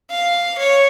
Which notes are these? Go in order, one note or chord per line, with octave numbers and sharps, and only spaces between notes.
F5
C#5